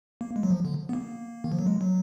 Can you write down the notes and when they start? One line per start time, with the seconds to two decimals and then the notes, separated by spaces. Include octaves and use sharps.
0.21 A#3
0.36 G#3
0.43 F#3
0.50 F3
0.65 D3
0.89 B3
0.93 A#3
1.44 D#3
1.52 F3
1.59 F#3
1.67 G#3
1.81 F#3